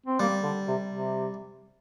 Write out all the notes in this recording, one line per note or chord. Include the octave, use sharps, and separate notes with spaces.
C4
G3 A#3
D3
C3
C3